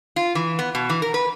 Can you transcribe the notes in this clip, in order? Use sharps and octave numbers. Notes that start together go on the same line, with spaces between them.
F4
E3
B3
B2
E3
A#4
B4